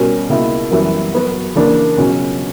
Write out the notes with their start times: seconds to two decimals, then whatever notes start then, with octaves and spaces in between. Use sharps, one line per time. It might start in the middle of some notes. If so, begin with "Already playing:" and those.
Already playing: B2 G3 C#4 G4 A#4
0.29 C#2 B2 A#3 E4
0.71 F#2 E3 G3 B3 E4
1.13 F#3 B3 F#4 B4
1.55 C#3 E3 A#3 D4
1.98 C#2 B2 F#3 C#4